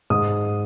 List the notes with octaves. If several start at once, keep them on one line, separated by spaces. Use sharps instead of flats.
G#2 D#6